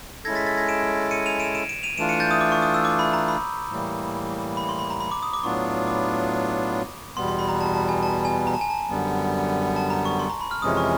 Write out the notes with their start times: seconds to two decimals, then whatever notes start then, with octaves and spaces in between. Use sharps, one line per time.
0.25 G#3 C#4 E4 A4 G#6 A#6
0.35 A6 B6
0.47 A6 B6
0.58 G#6 A#6
0.69 D7 E7
1.11 C#7 D#7
1.26 D#7 F7
1.40 D7 E7
1.55 D7 E7
1.69 D7 E7
1.83 D#7 F7
1.97 E3 A3 D4 F4 D7 E7
2.09 C#7 D#7
2.20 G6 A6
2.31 D#6
2.41 D6
2.52 C#6
2.62 D#6
2.74 E6
2.85 D6
2.99 B5
3.13 A#5
3.28 B5
3.71 A2 E3 G3 A#3
4.57 B5
4.69 C6
4.79 B5
4.90 A#5
5.00 B5
5.11 D6
5.23 D#6
5.34 D6
5.43 A2 F#3 B3 D4 F4 C#6
5.88 D6
7.17 E2 B2 G3 B3 C6
7.28 C6
7.39 B5
7.49 A#5
7.61 A5
7.74 A5
7.89 G#5
8.03 A5
8.25 G#5
8.47 A#5
8.54 A5
8.61 G#5
8.70 A5
8.89 F#2 D3 G3 B3
9.76 A5
9.90 A#5
10.05 C#6
10.19 C6
10.30 A#5
10.41 B5
10.51 F6
10.62 F2 C3 E3 G#3 C#4 D#6
10.77 C#6